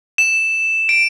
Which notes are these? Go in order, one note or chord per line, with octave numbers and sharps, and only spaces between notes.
E7
D7